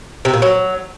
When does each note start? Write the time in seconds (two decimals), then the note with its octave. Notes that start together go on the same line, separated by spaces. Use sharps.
0.25 C3
0.34 A#2
0.42 F#3